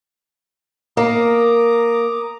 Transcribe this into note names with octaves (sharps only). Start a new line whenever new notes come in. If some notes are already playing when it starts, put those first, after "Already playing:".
A#3 A#5 D6 D#6